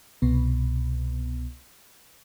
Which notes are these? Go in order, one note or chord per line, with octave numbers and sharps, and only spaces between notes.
C2 B2 B3